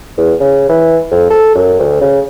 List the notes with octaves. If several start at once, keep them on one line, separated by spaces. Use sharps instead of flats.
E2
C#3
E3
F2
A4
F#2
D2
C#3